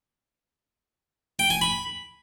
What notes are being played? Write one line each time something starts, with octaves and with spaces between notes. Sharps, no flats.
G5
G#5
B5